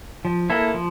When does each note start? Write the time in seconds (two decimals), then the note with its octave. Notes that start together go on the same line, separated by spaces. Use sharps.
0.25 F3
0.50 A#3 E4 A4
0.74 F3